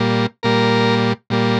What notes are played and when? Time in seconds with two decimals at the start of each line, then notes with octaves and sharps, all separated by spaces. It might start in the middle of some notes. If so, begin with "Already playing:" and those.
Already playing: A#2 G3 A#3
0.43 A#2 G3 A#3 A#4
1.30 A#2 G3 A#3